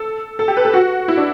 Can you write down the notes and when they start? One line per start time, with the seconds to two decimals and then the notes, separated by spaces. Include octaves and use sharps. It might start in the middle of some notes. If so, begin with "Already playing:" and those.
Already playing: A4
0.39 A4
0.48 G4
0.57 B4
0.65 A4
0.74 F#4
1.08 E4
1.17 D4